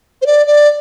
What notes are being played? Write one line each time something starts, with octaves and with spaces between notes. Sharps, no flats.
C5
D5
D5